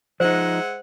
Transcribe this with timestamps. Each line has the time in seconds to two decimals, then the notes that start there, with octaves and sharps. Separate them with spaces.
0.20 F3 G#3 D#4 C5 E5 F#5